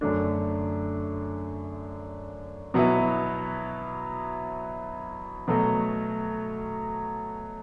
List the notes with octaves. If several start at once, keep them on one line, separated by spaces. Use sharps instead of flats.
F#2 D3 A3 D4
B2 F#3 B3 E4
B2 F#3 A3